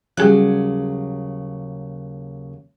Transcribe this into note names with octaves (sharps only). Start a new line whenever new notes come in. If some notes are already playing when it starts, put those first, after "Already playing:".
D#2 C#3 F#3 G3 G#4 F#6